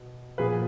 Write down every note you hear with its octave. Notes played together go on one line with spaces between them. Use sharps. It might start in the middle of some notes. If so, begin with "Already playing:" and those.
Already playing: B2
A#2 F3 B3 G#4 B4